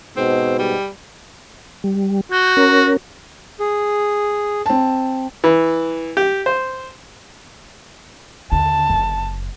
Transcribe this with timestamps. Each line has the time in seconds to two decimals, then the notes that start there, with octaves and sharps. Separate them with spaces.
0.17 G#2 B2 C4
0.59 G3
1.84 G3
2.32 F#4 G6
2.57 C#4 A#4
3.60 G#4
4.66 C4 A5
5.44 E3
6.17 G4
6.46 C5
8.52 D#2 D3 A5
8.90 F#1